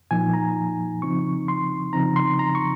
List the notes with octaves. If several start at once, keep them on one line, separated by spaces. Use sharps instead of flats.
A#2 F3 A#3 D#4 G#5
A#5
C#3 F3 C4 D#4 C#6
C6
C#3 F3 C4 D#4 A#5
C6
A#5
C#6